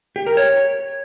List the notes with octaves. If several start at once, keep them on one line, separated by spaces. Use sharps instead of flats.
G4
A#4
C#5